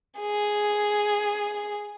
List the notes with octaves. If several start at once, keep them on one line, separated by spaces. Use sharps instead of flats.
G#4